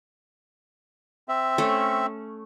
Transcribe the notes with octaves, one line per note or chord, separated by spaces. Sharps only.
C4 E5
A3 C#4